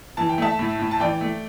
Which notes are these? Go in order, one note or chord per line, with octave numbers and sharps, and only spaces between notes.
E3 A5
G5
A3 E5 A5
A2
A2
A5
E3 D5 G5
A3